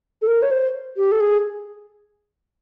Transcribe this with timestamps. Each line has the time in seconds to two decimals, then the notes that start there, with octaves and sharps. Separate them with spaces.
0.22 A4
0.27 A#4
0.42 C#5
0.51 C5
0.97 G4
1.12 A4
1.20 G#4